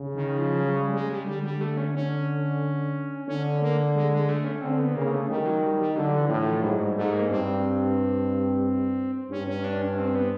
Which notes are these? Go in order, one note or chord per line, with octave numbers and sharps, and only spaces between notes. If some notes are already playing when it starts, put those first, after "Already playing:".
Already playing: C#3
D#3
F3
F#3
G3
G#3
G3
D3 G3
G3
A3
C#4
C#4
D3 C#4
A#3
G#3
G#3
A3
C#4
D3 C4
B3
C#3 A#3
A3
D#3 G3
F#3
G3
G3
D3 F#3
E3
A2
F3
G#2 F#3
G3
G#2 A3
A#3
G2 C4
G2 C#4
C#4
D4
C#4
C4
B3